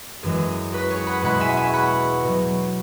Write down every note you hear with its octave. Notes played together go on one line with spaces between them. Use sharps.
F#2 E3 G#3 G#4
F#4 B4
G#4 C#5
F#5 B5
E2 B2 G#3 F#5 B5
E5 G#5
E5 G#5
C#6
F#5 B5
B2 F#3